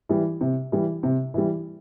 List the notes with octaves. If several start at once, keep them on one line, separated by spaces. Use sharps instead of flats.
E3 G3
C3
E3 G3
C3
E3 G3